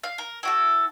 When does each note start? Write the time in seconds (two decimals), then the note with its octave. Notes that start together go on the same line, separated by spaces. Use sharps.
0.03 F5
0.18 A#4
0.43 E4 F#4 A4